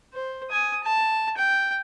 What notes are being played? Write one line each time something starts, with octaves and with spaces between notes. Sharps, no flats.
C5
G#5 D#6
A5
G5